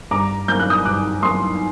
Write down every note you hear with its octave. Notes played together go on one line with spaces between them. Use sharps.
G2 A#5 D6
F#3 A#3 G6
F#6
D#6 G6
G2 D6 F#6
F#3 A#3 C6 D#6